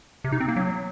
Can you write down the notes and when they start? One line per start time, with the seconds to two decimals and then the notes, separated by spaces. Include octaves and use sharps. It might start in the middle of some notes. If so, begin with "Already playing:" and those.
0.24 C3
0.32 D#4
0.40 C4
0.48 A#3
0.56 F#3